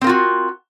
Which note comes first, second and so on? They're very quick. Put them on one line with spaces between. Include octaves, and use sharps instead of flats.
C4 A#4 F4 F#4